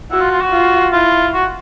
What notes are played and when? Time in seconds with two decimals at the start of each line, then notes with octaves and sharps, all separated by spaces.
0.11 E4 F#4
0.21 F4
0.31 F4
0.42 F#4
0.52 F4
0.92 E4 F4
1.33 F#4